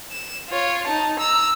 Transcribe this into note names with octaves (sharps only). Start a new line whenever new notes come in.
E7
F4 C#5
D#4 A5
A#5 E6